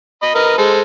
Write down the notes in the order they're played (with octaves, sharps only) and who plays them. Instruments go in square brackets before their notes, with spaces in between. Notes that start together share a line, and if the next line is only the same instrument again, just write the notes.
[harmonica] D#5 B5
A#4 B4 D#5
G#3 A4 C5